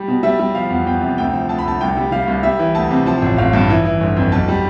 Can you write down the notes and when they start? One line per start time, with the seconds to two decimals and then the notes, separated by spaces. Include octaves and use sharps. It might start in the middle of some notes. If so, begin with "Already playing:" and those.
Already playing: G3
0.08 B2
0.23 G3 E5
0.39 G3
0.55 F3 F5
0.71 E2
0.87 E2 G5
1.02 C3
1.18 D2 G5
1.33 F3
1.49 D2 A5
1.58 B5
1.65 D2 A5
1.81 C2 G5
1.97 G3
2.12 G3 F5
2.28 C2
2.43 G3 E5
2.59 E3
2.75 D2 A5
2.91 C3
3.06 F3 A5
3.22 A1
3.38 A1 F5
3.53 G2
3.70 E3
3.85 E3
4.01 G1
4.17 F2
4.32 B1 A5
4.48 G3